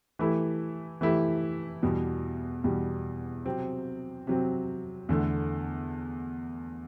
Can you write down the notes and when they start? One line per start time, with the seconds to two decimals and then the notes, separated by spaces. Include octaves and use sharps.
0.19 E3 A3 E4 G4
1.01 E3 A3 E4 G4
1.82 E2 B2 G3
2.64 E2 B2 G3
3.46 C3 F#3 C4
4.27 C3 F#3 C4
5.09 E2 D3 A3